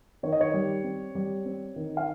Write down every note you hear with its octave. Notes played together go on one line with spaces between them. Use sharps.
D#3 C#5
D#5
C#5
G3
C4
G3
C4
D#3
F5